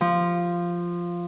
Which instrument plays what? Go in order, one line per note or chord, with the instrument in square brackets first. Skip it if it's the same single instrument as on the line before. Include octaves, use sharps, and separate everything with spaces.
[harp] F3